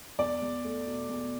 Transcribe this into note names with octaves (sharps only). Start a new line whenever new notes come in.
E2 D5
E2
A3
B2
E2